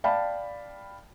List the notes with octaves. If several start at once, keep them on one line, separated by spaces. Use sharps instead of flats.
D5 F5 G5 A5 B5